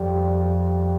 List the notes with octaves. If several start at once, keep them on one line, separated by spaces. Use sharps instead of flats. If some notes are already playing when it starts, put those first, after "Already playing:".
Already playing: F2 G3
G3